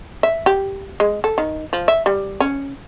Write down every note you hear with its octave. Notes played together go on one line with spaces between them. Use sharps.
E5
G4
G#3
A4
D#3
F3
E5
G3
C#4